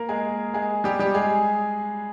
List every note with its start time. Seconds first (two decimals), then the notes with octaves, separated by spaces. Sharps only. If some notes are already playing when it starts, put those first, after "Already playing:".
Already playing: A#3 A#4
0.09 G#3 G#4
0.54 G#3 G#4
0.84 G3 G4
0.99 G3 G4
1.14 G#3 G#4